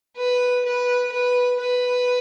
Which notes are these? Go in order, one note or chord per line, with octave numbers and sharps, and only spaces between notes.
B4
B4
B4
B4